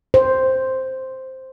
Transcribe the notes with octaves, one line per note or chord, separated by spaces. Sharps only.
C5